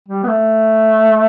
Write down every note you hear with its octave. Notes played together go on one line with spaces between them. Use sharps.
G3
B3
A3